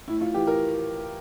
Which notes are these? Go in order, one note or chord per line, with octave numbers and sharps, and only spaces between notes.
A2 E4
F4
E3 G4
A#4